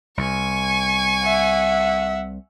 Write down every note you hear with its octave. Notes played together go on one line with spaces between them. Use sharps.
C2 G#5 C#6
E5 F#5